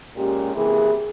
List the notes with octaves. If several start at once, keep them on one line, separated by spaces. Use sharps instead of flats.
A#2 G#3 C#4 G4
C3 E3 A#3 E4 G#4